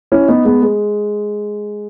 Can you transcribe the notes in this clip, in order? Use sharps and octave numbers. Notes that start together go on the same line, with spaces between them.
C#4 E4
B3 D#4
G#3 B3
G#3